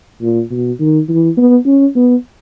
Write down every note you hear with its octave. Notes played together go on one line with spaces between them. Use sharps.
A#2
B2
D#3
E3
B3
C#4
B3